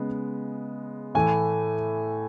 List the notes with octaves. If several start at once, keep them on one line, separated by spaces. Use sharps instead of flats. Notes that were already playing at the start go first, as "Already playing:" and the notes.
Already playing: C#3 G#3 B3
A2 E3 A3 G#5